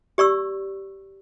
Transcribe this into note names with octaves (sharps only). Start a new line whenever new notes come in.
G4 D5 C#6 E6